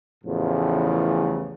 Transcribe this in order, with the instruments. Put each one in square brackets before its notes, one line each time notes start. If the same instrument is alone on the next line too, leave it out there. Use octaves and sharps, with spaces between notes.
[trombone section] A1 E2 A2 C#3 F3